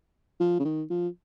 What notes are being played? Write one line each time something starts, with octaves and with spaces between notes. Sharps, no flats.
F3
C#3
D#3
F3